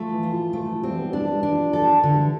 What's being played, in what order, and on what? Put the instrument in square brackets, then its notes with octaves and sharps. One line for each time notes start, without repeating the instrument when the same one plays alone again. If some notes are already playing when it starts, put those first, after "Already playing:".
Already playing: [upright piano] F3 [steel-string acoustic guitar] A3
[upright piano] E3
[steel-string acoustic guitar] F4
[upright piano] F3
[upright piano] F3 [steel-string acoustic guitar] A3
[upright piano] F3
[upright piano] E3 G3 [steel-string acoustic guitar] C4
[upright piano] G3 B3
[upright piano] G3 B3 [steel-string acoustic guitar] D4
[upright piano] E3 G3
[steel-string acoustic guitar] D4
[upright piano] F3
[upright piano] F3 [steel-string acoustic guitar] A4
[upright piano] F3
[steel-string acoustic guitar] D3
[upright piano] E3 G3